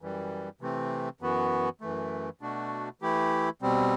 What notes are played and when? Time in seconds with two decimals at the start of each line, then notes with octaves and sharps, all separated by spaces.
0.01 F#2 E3 G3
0.61 C3 E3 A3 C4
1.21 F#2 E3 B3 F#4
1.81 F#2 E3 A3
2.41 B2 A3 D4 F#4
3.02 E3 A3 E4 G4
3.62 B2 G3 C4